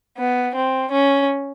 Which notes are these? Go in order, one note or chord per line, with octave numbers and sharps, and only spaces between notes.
B3
C4
C#4